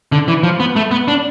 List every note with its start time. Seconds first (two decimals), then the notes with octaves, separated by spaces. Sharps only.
0.12 D3
0.28 E3
0.43 F3
0.60 B3
0.76 A3
0.91 B3
1.08 D4